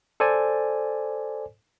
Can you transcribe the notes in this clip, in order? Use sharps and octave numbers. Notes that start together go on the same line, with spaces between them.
A4 C5 D5 G#5